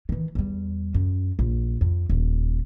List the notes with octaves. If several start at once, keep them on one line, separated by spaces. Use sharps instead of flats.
D#3 E3
E2 G3
F#2
A#1
F2
D#1 D#3